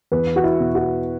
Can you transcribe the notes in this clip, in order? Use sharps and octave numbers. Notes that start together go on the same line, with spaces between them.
E2 B4
F#4
E4
B2
F#4